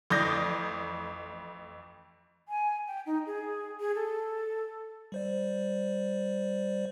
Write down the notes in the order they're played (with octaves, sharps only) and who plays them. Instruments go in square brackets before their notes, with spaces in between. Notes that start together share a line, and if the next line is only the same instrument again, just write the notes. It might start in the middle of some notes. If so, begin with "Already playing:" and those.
[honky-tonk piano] A1 F2 D5 D#6 G6 A#6
[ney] G#5
G5
D#4
G#4
G#4
A4
[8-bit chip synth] G3 C5 D5